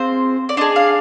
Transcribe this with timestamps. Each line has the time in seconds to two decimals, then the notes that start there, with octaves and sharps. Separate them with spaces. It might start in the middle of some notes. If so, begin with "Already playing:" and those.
Already playing: C4 F4 G#4 C5
0.49 D5
0.57 D4 G#4 D#5
0.76 F5